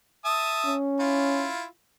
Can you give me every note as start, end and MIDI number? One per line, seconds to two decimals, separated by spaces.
0.25 0.73 76
0.25 0.73 81
0.25 0.73 87
0.65 1.49 61
1.00 1.64 64
1.00 1.64 65